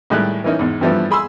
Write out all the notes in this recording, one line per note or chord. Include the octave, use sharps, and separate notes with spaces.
A2 D#3 G3 G#3 G4 F#6
E3 A#3 C#4 D#4 E4
E2 G#2
G2 E3 F3 G3 A3 B3
G#4 B5 C6 E6